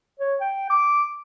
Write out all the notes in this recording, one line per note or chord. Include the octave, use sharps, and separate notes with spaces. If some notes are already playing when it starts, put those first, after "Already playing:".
C#5
G5
D6